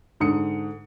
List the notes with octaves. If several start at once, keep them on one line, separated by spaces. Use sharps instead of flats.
G#2 D3 D#6 C#7